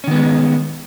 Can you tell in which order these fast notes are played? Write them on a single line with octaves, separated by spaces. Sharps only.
C#4 D#3 B3 G#3